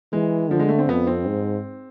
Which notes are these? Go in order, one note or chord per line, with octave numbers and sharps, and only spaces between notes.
E3 G#3
D3 F3
G#3
A3
C4
F2 B3
C4
G#2